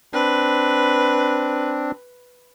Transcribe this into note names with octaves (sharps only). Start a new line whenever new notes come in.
C4 D4 B4